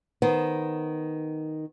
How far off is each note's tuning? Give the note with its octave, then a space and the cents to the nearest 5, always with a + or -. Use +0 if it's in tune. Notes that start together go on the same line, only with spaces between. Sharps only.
D#3 +0 B3 +0 C5 +0